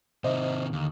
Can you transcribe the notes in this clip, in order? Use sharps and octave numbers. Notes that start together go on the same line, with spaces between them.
C3 D#3 C5 D#5 E5
D#2 D3